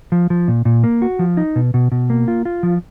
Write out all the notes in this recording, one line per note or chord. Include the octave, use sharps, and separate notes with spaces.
F3
F3
A#2
A#2
A#3
F#4
F3
D#4
B2
B2
B2
A#3
F4
F4
F3